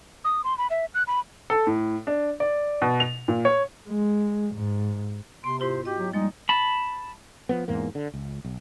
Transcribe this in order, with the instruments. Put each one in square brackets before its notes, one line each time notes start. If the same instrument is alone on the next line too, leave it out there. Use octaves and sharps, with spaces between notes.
[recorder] D#6
C6
B5
E5
F#6
B5
[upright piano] A4
A2
D4
D5
B2
F7
A#2
C#5
[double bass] G#3
G#2
[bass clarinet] C3 [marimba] B3 [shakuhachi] C6
[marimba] G#2 E4 F4 [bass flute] G4 [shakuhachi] C5
[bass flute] F#4 [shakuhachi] G4 [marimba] D#5 G5
[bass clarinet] F#3
[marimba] F3 A#3 [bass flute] G3 [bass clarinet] G#3 [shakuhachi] D#4
[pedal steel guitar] A5 B5
[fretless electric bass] F3 G#3 B3
E2 G#2 A#3
D3
C#2
B1